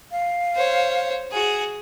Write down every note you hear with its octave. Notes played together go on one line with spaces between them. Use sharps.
F5
C5 C#5
F#4 G#4